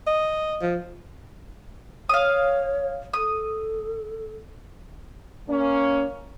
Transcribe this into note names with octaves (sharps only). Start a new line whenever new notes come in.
D#5
F3
C#5 F5 D#6
A4 D#6
A#3 C#4